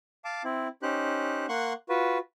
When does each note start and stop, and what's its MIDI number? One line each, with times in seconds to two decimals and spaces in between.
0.25 0.43 77
0.25 0.43 81
0.25 0.43 86
0.44 0.68 60
0.44 0.68 64
0.83 1.46 61
0.83 1.46 63
0.83 1.46 67
0.83 1.46 72
0.83 1.46 90
1.49 1.73 58
1.49 1.73 78
1.49 1.73 84
1.49 1.73 85
1.49 1.73 90
1.89 2.18 65
1.89 2.18 66
1.89 2.18 71